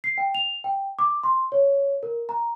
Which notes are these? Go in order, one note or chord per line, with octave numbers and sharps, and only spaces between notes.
C7
G5
F7
G5
D6
C6
C#5
A#4
A#5